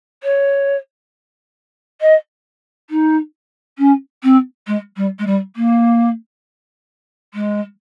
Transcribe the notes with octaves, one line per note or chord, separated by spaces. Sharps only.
C#5
D#5
D#4
C#4
C4
G#3
G3
G#3
G3
A#3
G#3